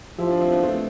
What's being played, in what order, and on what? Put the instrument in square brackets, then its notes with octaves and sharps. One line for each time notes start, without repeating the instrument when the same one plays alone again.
[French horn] F3 [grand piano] E4 G4
[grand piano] D4 F4
C4 E4
B3 D4
A3 C4